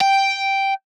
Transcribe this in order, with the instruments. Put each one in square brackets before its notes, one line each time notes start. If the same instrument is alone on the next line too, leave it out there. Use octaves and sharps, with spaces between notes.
[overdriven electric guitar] G5